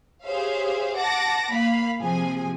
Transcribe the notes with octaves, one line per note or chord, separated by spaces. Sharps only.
G4 G#4 C5 C#5 E5 F5
F#5 A5 D6 A6 A#6
A#3 F5 B5
C3 F3 G#4 G#5